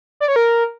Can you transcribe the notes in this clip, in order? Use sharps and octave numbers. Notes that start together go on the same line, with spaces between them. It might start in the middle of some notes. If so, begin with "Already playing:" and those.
D5
C#5
A#4